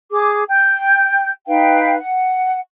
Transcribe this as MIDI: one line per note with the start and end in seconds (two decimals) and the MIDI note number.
0.11 0.42 68
0.11 0.42 86
0.48 1.30 79
0.48 1.30 91
1.47 1.96 63
1.47 1.96 71
1.47 1.96 77
1.47 1.96 79
1.99 2.59 78